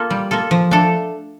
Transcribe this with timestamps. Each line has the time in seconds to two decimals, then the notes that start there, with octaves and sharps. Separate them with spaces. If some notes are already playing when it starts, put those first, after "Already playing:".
Already playing: A#3 F4 A4
0.10 G3
0.31 A#3 F4 A4
0.51 F3
0.71 A3 D4 A4